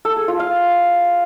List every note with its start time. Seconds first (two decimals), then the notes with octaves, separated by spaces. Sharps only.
0.05 A4
0.16 G#4
0.28 F4
0.40 F5